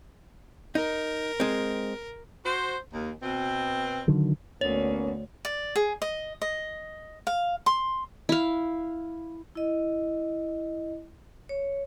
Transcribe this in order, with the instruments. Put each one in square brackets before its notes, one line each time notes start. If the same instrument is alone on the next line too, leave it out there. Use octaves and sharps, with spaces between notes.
[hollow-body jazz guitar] D#4 [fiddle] A#4
[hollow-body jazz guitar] G#3 C4
[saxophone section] F#4 C5
D#2
B2 C4
[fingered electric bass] D3 D#3 F#3
[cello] D2 [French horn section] A#3 B3 C#4 [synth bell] C#5
[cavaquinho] D5
G#4
D#5
D#5
F5
C6
[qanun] E4 F5
[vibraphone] E4 D#5
C#5